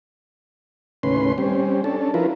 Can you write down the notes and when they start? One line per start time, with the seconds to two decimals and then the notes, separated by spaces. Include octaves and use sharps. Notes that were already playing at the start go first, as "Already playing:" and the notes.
1.03 D#2 A2 C#3 C#4 B4 C6
1.38 G3 C4 C#4
1.84 C#4 D4 A4
2.14 F3 E4 F4 A#4 B4